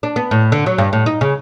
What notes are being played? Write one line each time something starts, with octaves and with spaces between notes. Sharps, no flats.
D4
B3
A2
D3
F#3
G2
A2
D#4
C#3